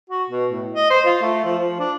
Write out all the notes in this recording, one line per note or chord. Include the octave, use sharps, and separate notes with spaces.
F#4
B2
A2
D#5
C5
F4
A3
F3
F3
D4